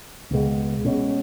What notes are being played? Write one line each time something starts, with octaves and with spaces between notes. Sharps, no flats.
C#2 B2 G#3
B2 G#3 C#4